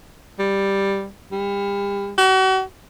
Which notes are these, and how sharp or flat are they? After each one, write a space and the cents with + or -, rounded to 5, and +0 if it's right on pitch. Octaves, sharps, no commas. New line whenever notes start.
G3 +5
G3 +35
F#4 +40